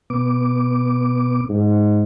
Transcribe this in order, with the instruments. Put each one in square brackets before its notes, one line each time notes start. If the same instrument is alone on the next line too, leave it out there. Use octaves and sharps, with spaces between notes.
[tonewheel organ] B2 B3 D6
[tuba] G#2